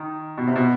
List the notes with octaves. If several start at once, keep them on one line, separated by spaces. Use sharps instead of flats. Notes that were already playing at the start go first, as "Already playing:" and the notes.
Already playing: D#3
B2
C3
B2